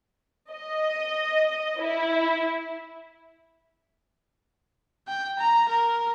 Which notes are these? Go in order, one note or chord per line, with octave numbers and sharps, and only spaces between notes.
D#5
E4
G5
A#5
A#4